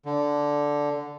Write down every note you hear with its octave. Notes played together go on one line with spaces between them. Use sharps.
D3